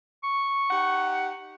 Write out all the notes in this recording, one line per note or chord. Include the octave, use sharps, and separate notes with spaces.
C#6
D#4 G4 F#5